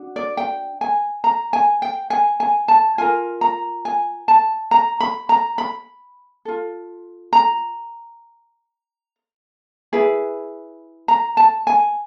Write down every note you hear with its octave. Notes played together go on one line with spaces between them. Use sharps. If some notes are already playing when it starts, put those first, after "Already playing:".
Already playing: D4 F#4
D5
G5
G#5
A#5
G#5
G5
G#5
G#5
A5
F4 A#4 G#5
A#5
G#5
A5
A#5
B5
A#5
B5
F4 A4
A#5
E4 G#4 B4
A#5
A5
G#5